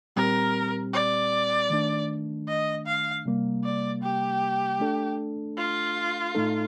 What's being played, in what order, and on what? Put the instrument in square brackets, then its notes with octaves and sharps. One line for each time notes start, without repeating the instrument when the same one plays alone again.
[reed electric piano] A#2 G3 C4 G4 [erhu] A#4
[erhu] D5
[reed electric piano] D#3 A3 D4
[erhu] D#5
F5
[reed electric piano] C3 G3 A#3
[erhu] D5
G4
[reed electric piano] A3 D4 A4
[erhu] F4
[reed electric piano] A2 A3 D#4 A4